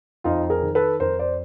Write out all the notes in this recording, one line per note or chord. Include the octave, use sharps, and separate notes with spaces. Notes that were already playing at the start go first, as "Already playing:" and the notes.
F2 D#4 F4
G#4 A#4
D#3
A4 B4
F2 A#4 C5
C5 D5